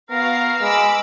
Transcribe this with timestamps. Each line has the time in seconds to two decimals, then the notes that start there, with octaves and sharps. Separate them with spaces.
0.10 B3 F#4 A#4 F5
0.61 G#3 B5 D6 E6